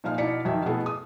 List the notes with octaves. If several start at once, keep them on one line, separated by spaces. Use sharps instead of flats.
A#2 F3 D#4 F5 F6
B2 D#4 E4 D5 B6 C#7
F2 D#3 F#3 E5 G5
B2 A3 B3 E4 G#4 A4
D#6